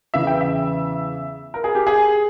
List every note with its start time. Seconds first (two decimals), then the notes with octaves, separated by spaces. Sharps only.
0.14 E2 C#3 E3 E5
0.27 G5
0.41 E5
1.54 A#4
1.64 G#4
1.75 G4
1.87 G#4